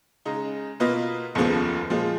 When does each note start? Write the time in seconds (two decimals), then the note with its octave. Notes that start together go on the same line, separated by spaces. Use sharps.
0.25 C#3 G#3 D#4
0.80 B2 A#3 F4 B4 D#5
1.35 F1 D#2 C#3 F3 B3
1.90 A#2 F3 G#3